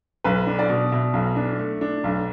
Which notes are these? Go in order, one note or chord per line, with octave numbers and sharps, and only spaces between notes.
B1 B4
D4
D5
B2
B2 E5
B1
D4
A3
D4
B1